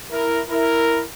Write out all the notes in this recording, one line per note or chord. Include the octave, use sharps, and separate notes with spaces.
E4 A#4
E4 A#4